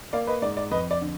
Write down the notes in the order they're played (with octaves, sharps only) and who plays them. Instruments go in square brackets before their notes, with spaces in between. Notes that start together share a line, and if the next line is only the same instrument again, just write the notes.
[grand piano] A#3 D5 F5
B4 D#5
G#2 D5
D5
F2 B4 D#5
D5
D3